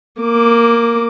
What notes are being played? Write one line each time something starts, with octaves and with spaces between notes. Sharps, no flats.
A#3 D6